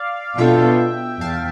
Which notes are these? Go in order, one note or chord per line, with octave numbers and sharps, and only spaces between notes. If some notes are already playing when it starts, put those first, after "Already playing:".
Already playing: D5 F5
B2 B3 D4 F4 A4 E5 G5
E2 F5 A5